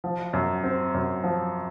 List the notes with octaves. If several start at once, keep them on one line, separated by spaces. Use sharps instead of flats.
F3
F#2
C4
F#2
F3